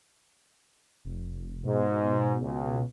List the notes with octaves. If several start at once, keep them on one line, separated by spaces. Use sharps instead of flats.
F1
G#2 B2
C#2